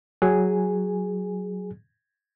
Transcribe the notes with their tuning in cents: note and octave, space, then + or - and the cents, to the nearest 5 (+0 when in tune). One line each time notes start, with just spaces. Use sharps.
F#3 +0 G#4 +0 G#5 -5